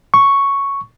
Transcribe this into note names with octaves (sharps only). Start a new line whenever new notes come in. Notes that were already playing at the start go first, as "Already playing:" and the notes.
C#6